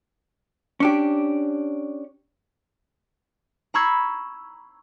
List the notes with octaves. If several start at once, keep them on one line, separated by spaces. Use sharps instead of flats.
C#4 D4 G4
A#5 B5 C#6 E6 G#6 C7